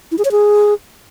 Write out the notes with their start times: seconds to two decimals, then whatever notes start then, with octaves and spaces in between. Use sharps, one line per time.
0.12 E4
0.18 G#4
0.25 C#5
0.32 G#4